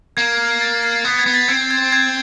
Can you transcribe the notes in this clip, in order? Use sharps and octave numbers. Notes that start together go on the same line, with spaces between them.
A#3 G#6
G#6
G#6
A6
C7
B3
G#6
B3
A6
C4 G#6
G#6
G#6